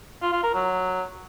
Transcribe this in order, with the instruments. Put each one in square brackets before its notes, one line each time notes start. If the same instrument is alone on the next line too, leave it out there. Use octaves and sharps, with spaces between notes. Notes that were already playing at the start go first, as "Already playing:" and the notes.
[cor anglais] F4
F4
A#4
F#3